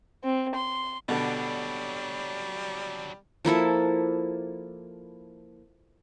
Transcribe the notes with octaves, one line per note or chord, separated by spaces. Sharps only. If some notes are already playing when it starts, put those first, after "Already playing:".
C4
C6
B2 D3 F#3 G3 D4
F3 A#3 E4 A4